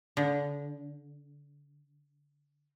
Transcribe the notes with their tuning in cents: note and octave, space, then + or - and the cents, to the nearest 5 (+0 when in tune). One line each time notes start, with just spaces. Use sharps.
D3 -30